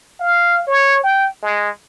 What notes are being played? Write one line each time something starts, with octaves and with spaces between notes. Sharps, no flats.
F5
C#5
G5
G#3